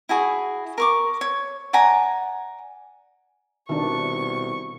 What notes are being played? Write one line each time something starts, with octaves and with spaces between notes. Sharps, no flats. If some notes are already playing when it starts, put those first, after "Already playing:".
E4 F#4 G#4
A#4 C#6 D6
C#5
D5 F#5 G#5 A#5
C2 B2 D#3 D4 C#6